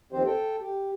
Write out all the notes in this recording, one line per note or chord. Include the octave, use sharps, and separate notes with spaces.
D#2 D#3 F3 C4 G4 C5
A4 G5
G4